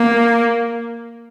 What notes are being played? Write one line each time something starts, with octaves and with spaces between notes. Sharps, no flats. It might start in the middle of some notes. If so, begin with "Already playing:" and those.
Already playing: A#3